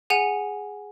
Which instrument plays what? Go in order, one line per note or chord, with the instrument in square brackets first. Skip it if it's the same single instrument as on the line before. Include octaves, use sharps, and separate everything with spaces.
[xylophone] G#4 F#5 G#5 D#7